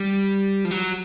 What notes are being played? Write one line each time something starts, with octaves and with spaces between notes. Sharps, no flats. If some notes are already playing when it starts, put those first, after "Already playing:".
Already playing: G3
F3
F#3